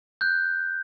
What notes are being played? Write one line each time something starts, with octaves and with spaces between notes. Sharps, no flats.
F#6 G6